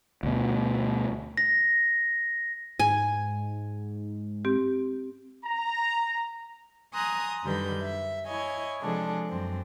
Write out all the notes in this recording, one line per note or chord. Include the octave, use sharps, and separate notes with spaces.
D2 B2
A#6
G#2 G#5
C4 G4
A#5
G#5 A#5 C6 D#6 F#6
F#2 D3 D#3 G3 B4 G6
E5
E4 C#5 D#5 G#5
C3 F3 G#3 D4 G#4 A4
F#2 C4